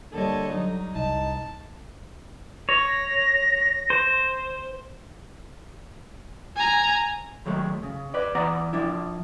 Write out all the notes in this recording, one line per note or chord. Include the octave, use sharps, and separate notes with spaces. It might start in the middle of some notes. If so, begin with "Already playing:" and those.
D3 G3 A#3 A4 C#5 D#5
F#3 G3 D#4
C2 D#4 A5
C#5 A#6
C5
G#5 A#5
D#3 F#3 G#3 A3
C#3
B4 D5
E3 B3 D5 F#5 A#5
F3 D4 E4